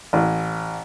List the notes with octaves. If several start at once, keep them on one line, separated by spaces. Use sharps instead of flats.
A1